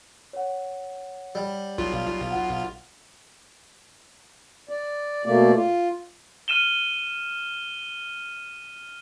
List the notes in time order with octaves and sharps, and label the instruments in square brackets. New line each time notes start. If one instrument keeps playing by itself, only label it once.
[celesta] C#5 F#5
[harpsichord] G3
[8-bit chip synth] B1 F4
[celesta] F#5
[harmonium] D5
B2 A3 A#3 D5
F4
[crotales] F6 D#7 E7 G7